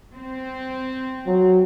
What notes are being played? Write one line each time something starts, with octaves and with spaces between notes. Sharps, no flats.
C4
F#3